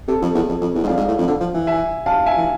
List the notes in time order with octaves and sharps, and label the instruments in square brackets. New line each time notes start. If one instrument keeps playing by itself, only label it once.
[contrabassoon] C3 [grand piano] A4
[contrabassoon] F2
E2
F2
F2
E2
G#2
[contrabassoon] F2 [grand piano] D5 F5
[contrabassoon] G#2
A2
F2
D3
F3
E3
[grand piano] E5 G#5
F5 A5
E5 G#5
[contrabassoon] E3